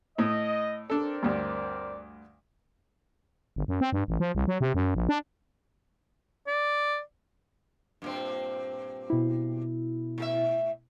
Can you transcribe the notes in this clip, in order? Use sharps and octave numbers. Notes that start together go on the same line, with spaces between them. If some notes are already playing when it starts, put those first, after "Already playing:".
A2 D#5
C4 D4 A4 A#4 D5
D2 G2
G1
F#2
C4
G2
A1
F3
C2
F#3
C3
F#2
A#1
D4
D5
G2 A#2 C4
B2 E4
A2 G#4 E5